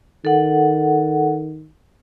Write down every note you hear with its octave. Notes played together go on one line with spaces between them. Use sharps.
D#3 A4 F#5